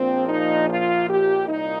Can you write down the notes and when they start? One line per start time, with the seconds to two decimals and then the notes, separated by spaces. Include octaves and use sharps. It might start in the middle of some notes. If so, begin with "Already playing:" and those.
Already playing: A#1 A#2 F3 C4
0.29 D#4
0.68 F4
1.08 G4
1.48 C2 A#2 D#4